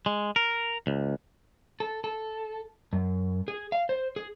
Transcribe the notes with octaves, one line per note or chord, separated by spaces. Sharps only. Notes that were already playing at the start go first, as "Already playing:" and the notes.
G#3
A#4
C#2
A4
A4
F#2
G#4
F5
C5
G#4